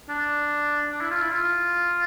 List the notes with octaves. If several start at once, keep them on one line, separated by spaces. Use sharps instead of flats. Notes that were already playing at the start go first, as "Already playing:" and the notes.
D4
D4
E4
F4
E4
F4